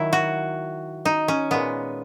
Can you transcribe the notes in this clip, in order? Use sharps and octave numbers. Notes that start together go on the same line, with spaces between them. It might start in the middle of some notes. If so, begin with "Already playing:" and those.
Already playing: D#3 F#3 E4
F#4
D#4
C#4
A#2 G#3 B3